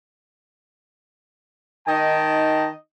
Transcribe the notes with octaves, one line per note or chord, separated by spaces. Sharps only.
D#3 D#4 D#5 G5 A5